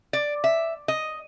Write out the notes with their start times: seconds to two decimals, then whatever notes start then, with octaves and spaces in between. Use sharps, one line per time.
0.13 D5
0.44 E5
0.88 D#5